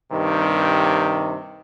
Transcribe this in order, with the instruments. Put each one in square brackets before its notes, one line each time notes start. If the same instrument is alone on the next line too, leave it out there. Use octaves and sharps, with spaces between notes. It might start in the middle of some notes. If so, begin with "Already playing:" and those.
[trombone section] G2 C3 D#3